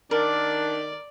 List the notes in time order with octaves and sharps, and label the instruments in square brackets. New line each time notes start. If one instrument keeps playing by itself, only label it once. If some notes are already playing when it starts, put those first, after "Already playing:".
[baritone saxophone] D#3 [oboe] D4 [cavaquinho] A#4 [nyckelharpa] D5